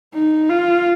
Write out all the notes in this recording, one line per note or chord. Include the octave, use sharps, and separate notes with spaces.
D#4
F4